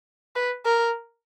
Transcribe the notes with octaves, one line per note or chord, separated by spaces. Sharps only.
B4
A#4